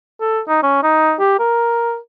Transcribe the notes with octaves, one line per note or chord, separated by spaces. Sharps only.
A4
D#4
C#4
D#4
G4
A#4